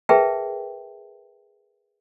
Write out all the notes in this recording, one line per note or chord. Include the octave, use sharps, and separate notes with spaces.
G#4 A#4 B4 E5 G5 A5